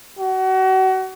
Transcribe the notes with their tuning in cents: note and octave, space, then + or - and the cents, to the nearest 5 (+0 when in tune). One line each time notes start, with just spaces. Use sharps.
F#4 +30